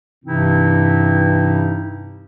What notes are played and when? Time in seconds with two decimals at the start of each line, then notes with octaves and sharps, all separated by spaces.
0.24 G2 C3 E3 C4 D#4 E4